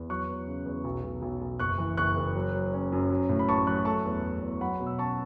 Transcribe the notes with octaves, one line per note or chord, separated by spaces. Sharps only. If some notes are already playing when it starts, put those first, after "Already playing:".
Already playing: E2
F#3 C#6 F#6
E2
C#3
E2
B1
B1
B1
B1
F#1 C#6 F#6
E3
F#1 C#6 F#6
F#1
F#3
F#3
C#4
F#2
F#3
A2
B5
A1 A5 C#6
F#3 C#6 F#6
A3 A5 C#6
E2
A3
E2
F#3 F#5 B5
B2
E6
C#4 A5 C#6